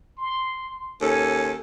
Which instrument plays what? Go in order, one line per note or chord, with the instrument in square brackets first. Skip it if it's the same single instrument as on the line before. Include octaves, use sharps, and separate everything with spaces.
[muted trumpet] C6
[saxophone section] D#2 C#4 A4 [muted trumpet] G#5